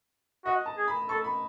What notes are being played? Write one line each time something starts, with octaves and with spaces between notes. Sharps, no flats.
F#4 D#5
A5
G#4
B5
A4 C#6
B5